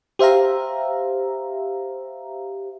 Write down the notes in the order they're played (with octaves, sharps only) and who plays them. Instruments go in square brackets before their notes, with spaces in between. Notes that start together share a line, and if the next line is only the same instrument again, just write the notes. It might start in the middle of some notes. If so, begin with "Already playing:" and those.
[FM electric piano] G4 C5 E5 F5 A#5